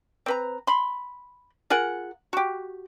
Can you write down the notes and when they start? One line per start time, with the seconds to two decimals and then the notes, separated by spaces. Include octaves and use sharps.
0.26 C4 B4 A#5
0.67 B5 C6
1.70 F4 G#4 A#4 F#5
2.33 F#4 G4